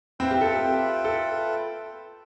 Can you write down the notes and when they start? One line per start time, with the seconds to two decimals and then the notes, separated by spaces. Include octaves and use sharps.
0.20 C4 F4 B4 E5 G5
0.31 G4
0.41 A4
0.51 G4
1.04 A4